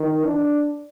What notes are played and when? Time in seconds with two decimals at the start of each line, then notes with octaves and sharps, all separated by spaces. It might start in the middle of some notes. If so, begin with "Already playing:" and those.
Already playing: D#3
0.25 D4